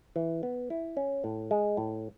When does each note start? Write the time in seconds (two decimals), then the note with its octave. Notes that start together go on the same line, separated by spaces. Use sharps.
0.16 E3
0.43 B3
0.70 E4
0.97 C#4
1.24 A2
1.51 G#3
1.77 A2